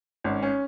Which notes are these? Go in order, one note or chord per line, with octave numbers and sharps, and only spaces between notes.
G#1 C#4
C#4